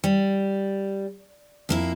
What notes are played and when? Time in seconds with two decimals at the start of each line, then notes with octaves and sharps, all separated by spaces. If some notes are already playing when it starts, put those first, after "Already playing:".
0.04 G3
1.69 F2 A#3 E4